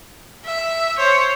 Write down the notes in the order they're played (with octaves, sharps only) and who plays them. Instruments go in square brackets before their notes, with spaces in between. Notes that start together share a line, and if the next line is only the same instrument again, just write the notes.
[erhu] E5
[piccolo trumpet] C5 [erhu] C#5